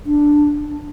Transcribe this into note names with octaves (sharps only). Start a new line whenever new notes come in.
D4